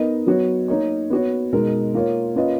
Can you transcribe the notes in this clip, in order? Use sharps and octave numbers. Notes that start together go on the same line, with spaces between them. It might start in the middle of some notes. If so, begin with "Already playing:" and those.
Already playing: B3 D#4 A#4 D#5
F#3 B3 F#4 C#5
A#3 D#4 A#4 C#5
B3 F#4 C#5
B2 G#3 D#4 A#4
A#3 F4 A#4 C#5
A#3 C#4 F4 B4 D#5